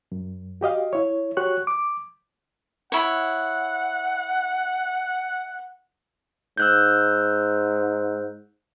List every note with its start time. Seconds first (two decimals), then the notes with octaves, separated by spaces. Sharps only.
0.12 F#2
0.61 F#4 G4 D#5 F5
0.93 E4 C#5
1.37 F#4 G4 C#5 C#6 F#6
1.67 D6
2.92 E4 C#5 F#5
6.57 G#2 E6 F#6 G6